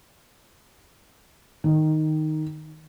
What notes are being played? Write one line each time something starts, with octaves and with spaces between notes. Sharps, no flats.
D#3